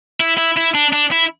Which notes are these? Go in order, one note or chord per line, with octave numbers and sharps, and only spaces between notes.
E4
E4
E4
D4
D4
E4